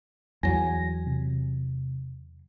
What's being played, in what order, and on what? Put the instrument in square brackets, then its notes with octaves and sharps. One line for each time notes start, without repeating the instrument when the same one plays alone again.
[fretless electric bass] E2 F#3 [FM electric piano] G#5 A#6
[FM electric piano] C3